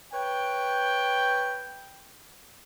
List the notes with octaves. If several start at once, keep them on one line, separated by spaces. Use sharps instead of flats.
B4 C#5 G5